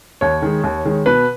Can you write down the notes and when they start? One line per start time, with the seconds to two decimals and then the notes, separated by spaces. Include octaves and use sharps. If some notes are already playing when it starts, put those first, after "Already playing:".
0.21 D#2 C#5
0.42 D#3 G#3
0.64 D#2
0.85 D#3 G#3
1.06 B2 B4